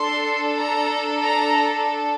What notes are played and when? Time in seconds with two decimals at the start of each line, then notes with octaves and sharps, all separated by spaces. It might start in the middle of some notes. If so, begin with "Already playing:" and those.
Already playing: D4 A4 C6
0.58 A#5
1.23 A#5